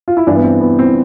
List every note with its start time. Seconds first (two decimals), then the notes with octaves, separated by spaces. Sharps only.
0.08 F4
0.17 E4
0.27 G2 E3 D4
0.36 B3
0.44 C4
0.61 B3
0.79 C4